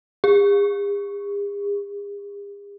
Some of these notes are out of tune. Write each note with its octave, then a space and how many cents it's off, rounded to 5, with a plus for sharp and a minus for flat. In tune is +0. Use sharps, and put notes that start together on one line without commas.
G#4 -45